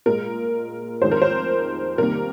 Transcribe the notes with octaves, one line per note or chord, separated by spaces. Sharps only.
A#2 G#3 A#4
F2 D#3 G#3 C5
A#4
C5
C3 D#3 G3 A#3 A#4